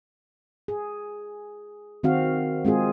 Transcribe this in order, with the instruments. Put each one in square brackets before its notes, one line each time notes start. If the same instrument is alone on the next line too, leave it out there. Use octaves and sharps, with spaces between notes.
[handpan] G#4
D#3 C4 F#4 F5
G#3 C4 F4 G#4